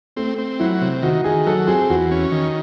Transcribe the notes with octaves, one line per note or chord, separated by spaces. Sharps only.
A3 C4
C4
F#3 E4
C3
D#3 F#4
D#3 G#4
F#3 A4
C4 G#4
E2 F#4
C#4
D#3